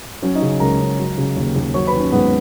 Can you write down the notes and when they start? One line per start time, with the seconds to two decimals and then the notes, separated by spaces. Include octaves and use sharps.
0.22 F#3 C#4 C#5
0.35 D#4 D#5
0.41 C#3
0.60 C#2 A#4 A#5
0.79 C#2
0.99 F#3
1.17 C#3
1.36 D#2
1.56 D#2
1.74 F#3 C#5 C#6
1.87 B4 B5
1.94 D#3
2.00 C#4 C#5
2.12 G#2 B3 B4